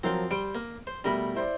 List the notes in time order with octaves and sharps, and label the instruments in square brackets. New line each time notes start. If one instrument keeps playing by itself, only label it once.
[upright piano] F3 F#3 A#4 [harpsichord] C4 F5 G5
[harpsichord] G3 C5 G5 [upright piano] D7
[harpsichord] A#3
C5
[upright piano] B2 A3 [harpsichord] G3 A#4 B5
[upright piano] E4 C5 D5